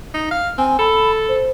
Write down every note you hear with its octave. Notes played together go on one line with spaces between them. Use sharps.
D#4
F5
C4 G#5
A4 B5
C5